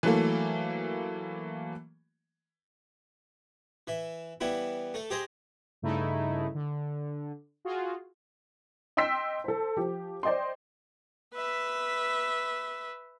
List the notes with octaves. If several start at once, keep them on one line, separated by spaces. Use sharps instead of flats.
E3 F#3 A3 A#3
E3 E5
E3 G3 B3 E4
A3 A4
G4 G#4 C5 D#5
G2 C#3 A3 D#4 E4
D3
F4 F#4 G#4
D#5 G5 C6 E6 B6
A4 C5
F3 G4
C5 D5 D#5 G5 C6
B4 E5